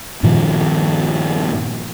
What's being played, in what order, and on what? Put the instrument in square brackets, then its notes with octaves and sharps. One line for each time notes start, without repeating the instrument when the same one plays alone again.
[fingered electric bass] G2 A#2 D#3 F3